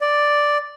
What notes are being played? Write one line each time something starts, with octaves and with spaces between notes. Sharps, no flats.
D5